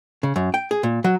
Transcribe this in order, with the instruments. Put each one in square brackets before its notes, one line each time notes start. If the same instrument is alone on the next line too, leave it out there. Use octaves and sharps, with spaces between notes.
[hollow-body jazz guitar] C#3
F#2
G5
G#4
A#2
F#3